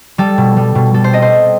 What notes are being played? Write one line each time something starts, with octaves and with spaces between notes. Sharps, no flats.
G3 A4
B2
G3
B2
G3 A4
C5
C4 D#5
C5
C4